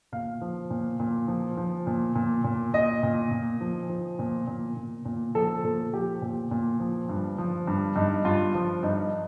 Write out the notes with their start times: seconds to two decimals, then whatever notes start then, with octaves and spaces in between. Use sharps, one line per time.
0.12 A#2 F5
0.41 F3
0.70 A#2
1.00 A#2
1.28 F3
1.57 F3
1.87 A#2
2.15 A#2
2.44 A#2
2.74 A#2 D#5
3.03 A#2
3.31 A#2
3.61 F3
3.89 F3
4.19 A#2
4.47 A#2
4.77 A#2
5.05 A#2
5.35 F3 A4
5.64 A#2 A4
5.93 F3 G4
6.22 A#2
6.51 A#2
6.80 F3
7.09 G2
7.38 F3
7.67 G2
7.96 G2 D#4
8.25 G2 F4
8.55 F3
8.83 G2 D#4